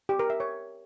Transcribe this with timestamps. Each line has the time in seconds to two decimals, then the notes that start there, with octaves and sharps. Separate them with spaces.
0.09 G4
0.19 A#4
0.30 E5
0.40 C#5